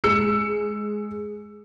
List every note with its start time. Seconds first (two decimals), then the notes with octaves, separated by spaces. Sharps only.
0.04 G#3 E6 C#7